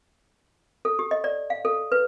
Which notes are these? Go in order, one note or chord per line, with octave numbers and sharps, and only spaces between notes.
A4
G4
D#5
D5
F5
A4
B4